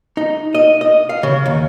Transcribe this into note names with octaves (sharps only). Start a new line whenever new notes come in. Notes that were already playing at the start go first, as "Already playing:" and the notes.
D#4
D#5
D#5
F5
C#3
D#2